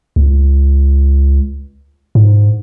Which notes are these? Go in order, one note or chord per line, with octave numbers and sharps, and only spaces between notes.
C#2
G#2